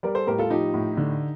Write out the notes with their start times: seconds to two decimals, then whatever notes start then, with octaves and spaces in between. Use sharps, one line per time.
0.03 G3 A#4 D5
0.15 A4 C5
0.27 A2 G4 A#4
0.38 F4 A4
0.50 F3 D#4 G4
0.74 A2
0.97 D3